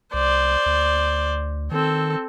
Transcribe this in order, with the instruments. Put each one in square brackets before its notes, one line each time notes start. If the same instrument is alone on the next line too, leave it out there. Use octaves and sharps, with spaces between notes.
[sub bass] C2 [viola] C5 D5
[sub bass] D2
[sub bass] D#3 [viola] C4 A4